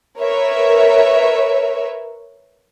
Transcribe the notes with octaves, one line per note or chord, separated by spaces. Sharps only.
A#4 B4 C#5 E5